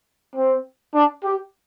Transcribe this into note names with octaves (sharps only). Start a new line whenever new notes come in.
C4
D4
G4